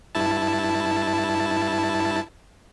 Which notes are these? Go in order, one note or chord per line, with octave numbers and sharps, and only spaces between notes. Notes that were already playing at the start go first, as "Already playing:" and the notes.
G2 E4 A5